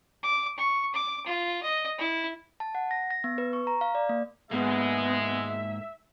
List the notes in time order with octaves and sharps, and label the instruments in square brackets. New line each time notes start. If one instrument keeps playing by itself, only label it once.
[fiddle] D6
C#6
D6
F4
D#5
E4
[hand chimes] A5
F#5
A#6
A#6
B3
B4
C#6
A#5
F5
D5
A#3
[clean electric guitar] G#2 A#3 [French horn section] G#3 [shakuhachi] B3 [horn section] E5